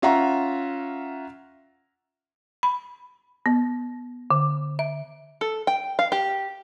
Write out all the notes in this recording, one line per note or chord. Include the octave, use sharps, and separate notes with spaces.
C#4 F4 E5 F#5 A#5
B5
B3
D3
E5
A4
G5
F5
G4